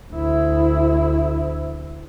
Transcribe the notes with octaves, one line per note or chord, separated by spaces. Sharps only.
D2 E4